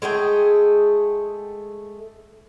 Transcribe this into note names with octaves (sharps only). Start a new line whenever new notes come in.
G#3 A3 G#4 G5